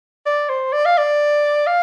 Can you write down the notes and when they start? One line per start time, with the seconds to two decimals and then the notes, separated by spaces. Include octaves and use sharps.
0.26 D5
0.49 C5
0.73 D5
0.86 F5
0.98 D5
1.67 F5